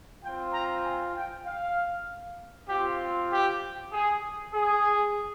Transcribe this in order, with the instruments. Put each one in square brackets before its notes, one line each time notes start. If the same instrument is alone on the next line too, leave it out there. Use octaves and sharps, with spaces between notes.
[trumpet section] C4 F4 G5
A#5
G#5
G5
F5
C4 F4 G4
G4
G#4
G#4